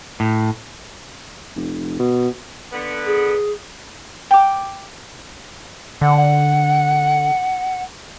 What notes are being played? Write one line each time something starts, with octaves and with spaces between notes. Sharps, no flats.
A2
F1
B2
D3 B3
G#4
G5 D6
D3 F#5